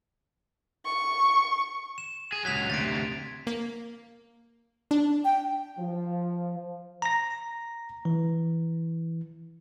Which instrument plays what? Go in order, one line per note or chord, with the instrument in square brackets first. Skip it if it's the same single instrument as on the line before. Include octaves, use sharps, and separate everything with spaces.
[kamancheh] C#6
[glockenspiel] E7
[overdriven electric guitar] G#4
[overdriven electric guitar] C#2 F#3 [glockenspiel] G#6 B6 F7
[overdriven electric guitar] D2 C3 [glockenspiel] A6 B6 D7
[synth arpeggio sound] A#3
D4
[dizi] G5
[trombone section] F3
[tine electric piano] A#5 A#6
E3